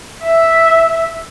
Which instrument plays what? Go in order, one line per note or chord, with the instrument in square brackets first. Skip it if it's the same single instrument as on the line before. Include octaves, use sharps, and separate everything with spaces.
[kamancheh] E5